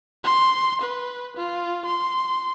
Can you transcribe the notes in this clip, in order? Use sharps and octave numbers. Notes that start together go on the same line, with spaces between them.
C6
B4
F4
C6